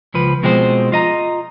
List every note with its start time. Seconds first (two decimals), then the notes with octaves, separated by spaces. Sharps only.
0.14 C#2 F3 B4
0.43 B2 F3 G#3 C4 F#4 C5
0.92 F4 D#5 A#5